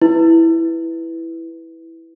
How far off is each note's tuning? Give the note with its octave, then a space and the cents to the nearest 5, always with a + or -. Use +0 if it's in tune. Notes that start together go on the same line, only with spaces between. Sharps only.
E4 +0 B4 +0